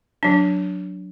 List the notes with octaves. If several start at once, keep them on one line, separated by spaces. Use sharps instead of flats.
F#3 D4